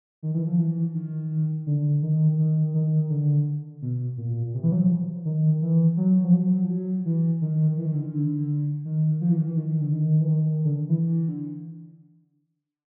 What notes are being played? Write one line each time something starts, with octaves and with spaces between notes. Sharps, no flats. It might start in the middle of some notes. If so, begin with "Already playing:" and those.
D#3
E3
F3
E3
D#3
D3
D#3
D#3
D#3
D3
B2
A#2
C3
E3
F#3
F3
D#3
E3
F#3
F3
F#3
F3
F#3
E3
D#3
E3
D#3
D3
D#3
D3
D#3
F3
E3
D#3
E3
D#3
D3
D#3
E3
D#3
D3
E3
D3